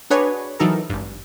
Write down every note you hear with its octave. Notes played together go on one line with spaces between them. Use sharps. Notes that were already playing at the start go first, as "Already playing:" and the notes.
D4 F#4 G#4 B4 C#5
E3 F#3 D#4 A4 A#4
G#1 G2